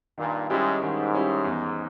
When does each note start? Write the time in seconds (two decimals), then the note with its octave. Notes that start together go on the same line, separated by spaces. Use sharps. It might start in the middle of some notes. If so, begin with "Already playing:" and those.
0.18 G2 A#2 D#3
0.50 G#2 G3 C#4 E4 G4
0.82 G#2 D#3
1.13 G3 C#4 E4 G4
1.44 E2